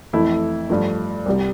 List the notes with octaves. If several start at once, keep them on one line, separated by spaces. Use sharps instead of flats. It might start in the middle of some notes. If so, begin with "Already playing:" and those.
F2 E3 A3 E4
G2 F3 A3
C2 C3 G3